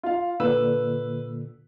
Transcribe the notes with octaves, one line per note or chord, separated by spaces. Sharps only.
F4 F5
A#2 D3 B4 E6